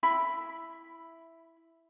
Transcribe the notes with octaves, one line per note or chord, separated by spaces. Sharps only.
E4 E5 B5